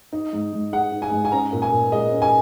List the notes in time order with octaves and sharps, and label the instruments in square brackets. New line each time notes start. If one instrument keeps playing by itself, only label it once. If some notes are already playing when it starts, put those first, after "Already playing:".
[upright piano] D#4
G#2
G#2
G#3 F#5
D#4
G#5
G#2
G#5
C#4 A#5
A#2
G#5
A#2
G#3 D#5
C#4
G#5